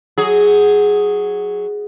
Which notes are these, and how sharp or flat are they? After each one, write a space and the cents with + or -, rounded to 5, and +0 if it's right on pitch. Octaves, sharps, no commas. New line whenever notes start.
F#3 +0 G#4 +0